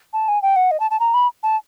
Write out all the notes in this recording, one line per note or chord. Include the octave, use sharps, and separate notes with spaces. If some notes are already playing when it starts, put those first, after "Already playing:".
A5
G#5
G5
F#5
D#5
A5
A5
A#5
B5
A5